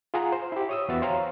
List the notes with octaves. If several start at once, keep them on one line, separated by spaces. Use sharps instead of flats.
F4 G#4 F#5 A#5
C5
E4 G4
C#5 D#6 E6
E2 B3 F#4 E5 A6
C5 C#5 F5 G5 A#5